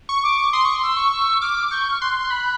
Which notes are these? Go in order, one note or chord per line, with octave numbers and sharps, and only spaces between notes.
C#6
D6
C6 D#6
C#6
C6
E6
C#6
E6
D6 F6
C#6 G6
F6
C6 F#6
B5